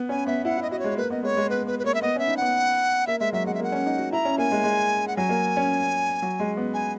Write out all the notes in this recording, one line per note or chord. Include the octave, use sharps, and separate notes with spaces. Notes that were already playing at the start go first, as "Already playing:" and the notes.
Already playing: B3
C#4 G#5
B3 E5
E4 F#5
E4 D#5
F#4 D#5
G#3 C#5
A#3 B4
B3 D#5
G#3 C#5
G#3
B3 B4
B3 B4
B4
A#3 C#5
E5
B3 D#5
C#4 E5
D#4
B3 F#5
A#3 E5
G#3 E5
F#3 E5
G#3 F#5
E5
A#3 F#5
C#4
D#4
F#4
E4 A#5
C#4
A#3 G#5
G#3
G#3
F#5
F#3 G#5
A#3
C#4
F#3
G#3
B3
G#5